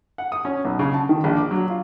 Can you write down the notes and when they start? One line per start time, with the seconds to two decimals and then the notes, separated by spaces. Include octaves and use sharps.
0.18 F#5
0.32 D#6
0.45 C#4
0.65 B1
0.79 C#3
0.94 A5
1.09 D#3
1.24 A#1
1.37 D6
1.51 F#3
1.70 F4